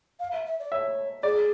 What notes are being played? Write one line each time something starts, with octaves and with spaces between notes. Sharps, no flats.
F5
E5
E5
D5
C#5 E5
G#4 D5